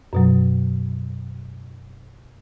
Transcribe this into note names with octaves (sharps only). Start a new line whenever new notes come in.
F#2 B2 F#3